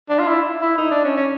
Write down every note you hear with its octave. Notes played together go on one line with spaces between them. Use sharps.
D4
F4
E4
E4
D#4
D4
C#4
C#4